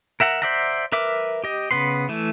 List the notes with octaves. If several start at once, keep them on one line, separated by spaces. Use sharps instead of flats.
A#4 E5 F#5 A#5
C5 D5 E5 F#5 A#5
A#4 B4 E5 D6
G4 D#5
C#3 B3 B4 C6
E3 A3